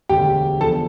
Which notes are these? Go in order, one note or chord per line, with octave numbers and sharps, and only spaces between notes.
E1 D2 D3 G4 G5
E2 D3 F3 A4 A5